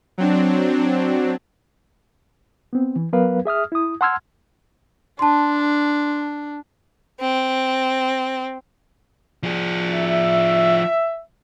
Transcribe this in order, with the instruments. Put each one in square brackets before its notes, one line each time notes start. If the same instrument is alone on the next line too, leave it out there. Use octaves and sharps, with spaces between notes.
[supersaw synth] F#3 C4 D4
[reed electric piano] B3 C4
E3
F#3 B3 A#4 B4 F5
G#4 E5 D#6 F6
E4 D#6
F#5 A5 C6 E6 F6 G#6
[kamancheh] D4 [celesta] A5 C6
[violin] C4
[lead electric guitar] F3 G#4
[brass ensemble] E5